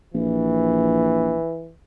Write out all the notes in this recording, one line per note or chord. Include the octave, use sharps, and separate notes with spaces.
A#1 E3